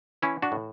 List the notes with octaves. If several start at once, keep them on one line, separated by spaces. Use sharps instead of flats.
E3 C#4 E4
D4 F#4
A2